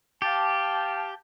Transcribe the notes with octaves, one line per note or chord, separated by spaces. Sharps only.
G4 F5 G5 A5